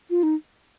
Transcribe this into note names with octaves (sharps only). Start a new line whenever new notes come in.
F4
D#4